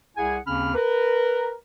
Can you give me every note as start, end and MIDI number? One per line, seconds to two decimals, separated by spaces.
0.17 0.38 36
0.17 0.38 64
0.17 0.38 68
0.17 0.38 78
0.17 0.38 80
0.47 0.74 39
0.47 0.74 49
0.47 0.74 60
0.47 0.74 61
0.47 0.74 83
0.47 0.74 89
0.75 1.53 70
0.75 1.53 71